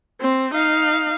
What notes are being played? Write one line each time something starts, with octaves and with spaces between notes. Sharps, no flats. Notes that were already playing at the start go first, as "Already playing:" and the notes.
C4
D#4 F5